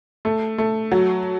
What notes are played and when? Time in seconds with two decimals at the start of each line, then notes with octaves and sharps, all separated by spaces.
0.25 A3
0.58 A3
0.92 F#3